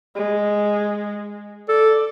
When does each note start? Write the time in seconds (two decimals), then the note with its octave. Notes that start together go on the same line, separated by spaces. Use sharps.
0.15 G#3
1.69 A4 D5